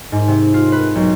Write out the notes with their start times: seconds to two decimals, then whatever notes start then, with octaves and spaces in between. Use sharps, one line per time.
0.12 G#2
0.28 C3
0.54 F4
0.72 B4
0.95 B1